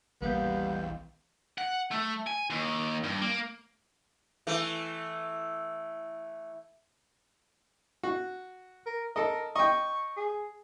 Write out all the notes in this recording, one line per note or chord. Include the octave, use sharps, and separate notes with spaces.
A#1 E2 G3 A#3 B3 F5 G6
F#5
A3
G#5
D#2
G2
A#3
E3 A3
F#4
A#4
A4 A#4 D#5
D#5 G5 C#6
G#4